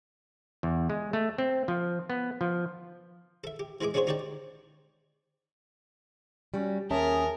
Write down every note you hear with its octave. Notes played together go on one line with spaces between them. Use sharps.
E2
G#3
A3
C4
F3
B3
F3
A4 E5
G4
E3 G#3 E4 G#4 D6
C#4 D4 F#4 G#4 C5 C#5
D#4 G4 C#5 D5 G5 A5
G3 C#4 F#4
D#2 C#4 G#4 A#4 E5 A5